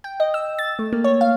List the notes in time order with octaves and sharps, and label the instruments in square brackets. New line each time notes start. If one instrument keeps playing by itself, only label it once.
[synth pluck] G5
D#5
E6
A6
A3
A#3
C#5
F5